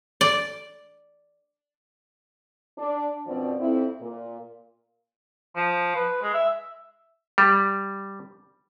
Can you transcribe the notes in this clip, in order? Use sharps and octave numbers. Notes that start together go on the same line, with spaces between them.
D5
D4
F#2 B2 F3 C4 D4 D5
F2 C4 E4
A#2
F3
B4
G#3
E5
G3